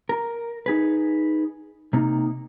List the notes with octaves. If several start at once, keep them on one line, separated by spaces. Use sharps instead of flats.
A#4
D#4 G#4 B4
C3 A#3 D#4